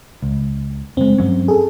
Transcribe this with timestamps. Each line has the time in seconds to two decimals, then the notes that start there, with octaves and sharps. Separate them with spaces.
0.22 C#2
0.97 F#1 G#3 C4
1.18 G2 F#3 C#4
1.48 G#4 A4